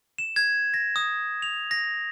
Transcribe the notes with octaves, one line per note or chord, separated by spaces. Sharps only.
E7
G#6
A#6
D#6
F7
A#6